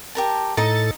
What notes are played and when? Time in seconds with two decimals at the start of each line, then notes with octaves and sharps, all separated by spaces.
0.15 G4 A#4 A5
0.57 A2 D#4 A4 D#5 A#5 A6